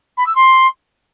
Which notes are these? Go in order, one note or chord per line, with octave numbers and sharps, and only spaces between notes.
B5
E6
C6